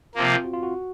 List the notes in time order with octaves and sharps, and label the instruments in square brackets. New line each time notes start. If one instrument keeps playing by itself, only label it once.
[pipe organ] C3 F3 A#3
[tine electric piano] C4
F4
F#4
F4
F#4